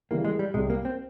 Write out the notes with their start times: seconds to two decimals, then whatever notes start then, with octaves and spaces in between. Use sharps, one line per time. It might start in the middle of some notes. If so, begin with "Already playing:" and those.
0.11 C#3 E3 G3 A#3
0.25 G#3
0.39 G3
0.54 C2 C3 G3 G#3
0.70 A#3
0.85 C4